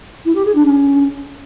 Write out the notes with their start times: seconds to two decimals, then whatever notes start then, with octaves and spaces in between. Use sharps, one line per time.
0.25 E4
0.35 G4
0.45 G#4
0.55 D4
0.65 C#4